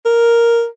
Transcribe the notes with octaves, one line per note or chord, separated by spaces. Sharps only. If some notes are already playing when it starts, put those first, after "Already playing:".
A#4